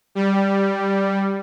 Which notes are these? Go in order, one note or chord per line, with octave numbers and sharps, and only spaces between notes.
G3